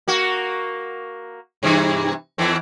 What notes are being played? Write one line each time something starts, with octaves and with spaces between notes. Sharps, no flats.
A#3 F#4
G2 C3 E3
E2 E3 C4